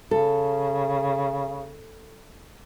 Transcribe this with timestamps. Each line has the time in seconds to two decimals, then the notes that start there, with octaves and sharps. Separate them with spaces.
0.11 C#3 A4